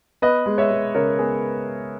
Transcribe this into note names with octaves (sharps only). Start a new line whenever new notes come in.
B3 B4 D#5
G#3
C#5 E5
G#3
C#3 A#4 C#5
B3 G#4 B4